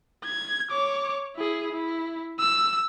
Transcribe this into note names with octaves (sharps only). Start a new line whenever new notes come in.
G#6
C#5 D6
E4 G#4
E4
E6